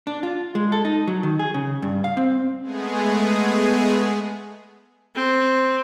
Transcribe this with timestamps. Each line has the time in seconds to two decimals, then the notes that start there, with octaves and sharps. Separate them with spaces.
0.07 D4
0.23 F4
0.55 G#3
0.72 A4
0.85 D#4
1.07 F#3
1.23 D#3
1.39 G#4
1.54 C#3
1.82 G2
2.04 F5
2.17 C4
2.62 G#3 A3 B3 G#4
5.15 C4